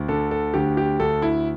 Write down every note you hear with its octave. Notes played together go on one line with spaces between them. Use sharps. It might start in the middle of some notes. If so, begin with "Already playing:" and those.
Already playing: D2
D3 A4
A4
D2 G4
G4
D2 A4
E4